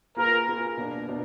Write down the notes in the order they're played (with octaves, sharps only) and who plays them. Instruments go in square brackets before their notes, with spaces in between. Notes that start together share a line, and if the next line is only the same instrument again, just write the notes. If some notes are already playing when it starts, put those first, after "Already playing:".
[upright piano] A#3 F4 G#4 B4 [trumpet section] A#4
[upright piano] A#3 F4 G#4 B4
B2 A#3 D4
B2 A#3 D4